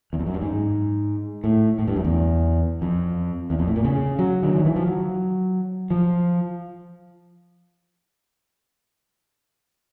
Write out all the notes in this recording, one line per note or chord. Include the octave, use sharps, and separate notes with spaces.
E2
F2
F#2
G2
G#2
A2
A2
G2
F#2
E2
F2
E2
F2
A2
A#2
C#3
F#3
D3
D#3
E3
F3
F#3
F3